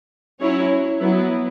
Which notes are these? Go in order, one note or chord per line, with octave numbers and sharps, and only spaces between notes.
F#3 C#4 E4 C#5
F#3 B3 E4